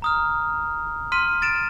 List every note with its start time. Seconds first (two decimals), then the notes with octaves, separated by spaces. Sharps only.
0.02 A#5 D#6 F6
1.12 C6 F6 B6 D#7
1.42 A6 D7 E7